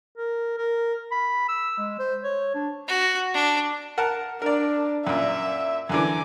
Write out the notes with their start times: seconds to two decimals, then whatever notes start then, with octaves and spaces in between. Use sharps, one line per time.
0.17 A#4
0.58 A#4
1.11 B5
1.48 E6
1.78 G#3
1.99 C5
2.23 C#5
2.54 D4
2.88 F#4
3.34 D4
3.98 A#4 F#5 A5
4.42 D4 A#4 D5
5.07 F#2 A#2 E5
5.89 F#2 D3 E3 G#5 D6